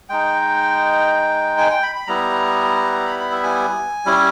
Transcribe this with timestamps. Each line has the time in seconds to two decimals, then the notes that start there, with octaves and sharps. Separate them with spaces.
0.09 G#3 D#4 G5
1.58 G#5
1.70 G5
1.83 B5
1.96 B5
2.07 G3 B3 E4 A#5
3.07 B5
3.20 B5
3.32 E5
3.44 G#5
4.06 G3 C#4 E4